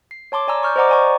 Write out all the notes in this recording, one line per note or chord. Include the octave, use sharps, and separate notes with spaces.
C7
C#5 A5 C6 D6
D5 G#5 A#5 E6
C#6 F6 G6
C5 D5 D#5 F#5 A#5 D6
D5 G#5 C#6